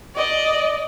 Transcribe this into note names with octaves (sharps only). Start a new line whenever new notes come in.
D5 D#5